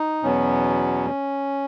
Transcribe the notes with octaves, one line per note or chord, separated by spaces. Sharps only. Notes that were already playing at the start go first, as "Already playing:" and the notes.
Already playing: D#4
E2 B2 F#3 B3 C#4